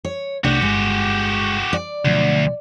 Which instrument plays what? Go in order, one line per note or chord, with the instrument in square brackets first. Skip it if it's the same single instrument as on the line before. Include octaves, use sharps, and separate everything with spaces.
[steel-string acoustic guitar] C#5
[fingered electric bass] C2 C3 A3 [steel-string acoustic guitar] D4 [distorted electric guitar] F#4 G4
[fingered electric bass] G1 [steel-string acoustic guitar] G#3
[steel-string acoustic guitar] D5
[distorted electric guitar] D2 [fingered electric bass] B2 F3 F#3